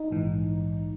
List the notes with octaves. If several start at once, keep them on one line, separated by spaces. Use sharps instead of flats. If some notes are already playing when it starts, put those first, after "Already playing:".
Already playing: D#4
A#1 G#2 E3